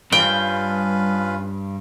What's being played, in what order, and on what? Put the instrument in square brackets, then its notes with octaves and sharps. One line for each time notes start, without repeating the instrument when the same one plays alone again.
[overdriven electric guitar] G2 [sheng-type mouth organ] C#4 F4 B4 [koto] G5